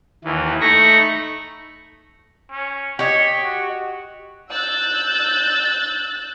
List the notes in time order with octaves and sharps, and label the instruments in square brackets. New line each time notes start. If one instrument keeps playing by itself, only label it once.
[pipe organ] D#2 E3
A3 D#4 B5 C#6 A#6
[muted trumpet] C#4
[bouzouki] G4 D#5 [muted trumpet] C#5
[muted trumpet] F#4
[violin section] E6 F#6 G6 A6